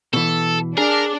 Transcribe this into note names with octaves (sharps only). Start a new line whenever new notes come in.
B2 E3 A4
D4 G#4 A#4